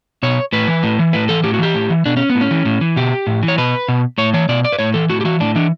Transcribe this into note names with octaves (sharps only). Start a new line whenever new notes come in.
B2 C#5
A2 B4
E3
A2
E3
A2 B4
E3 A4
A2 G4
F#4
E3 G4
A2
E3
B2 D4
C#4
B3
A2
C#4
E3
A2
E3
B2 G4
A2
E3
C#5
B2 B4
B2
A2 C#5
E3 C#5
B2 D5
D5
B4
A2 C#5
E3 A4
A2 F#4
G4
E3 F#4
A2 D4
E3 D4